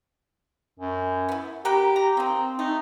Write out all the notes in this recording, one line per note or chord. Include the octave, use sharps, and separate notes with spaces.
F#2
B3 E4
G4 A#4 F#5 B5
A#5
A#3 C4 D#4
A3 D#4